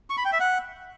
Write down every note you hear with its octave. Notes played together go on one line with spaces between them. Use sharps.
C#6
B5
G5
E5
F#5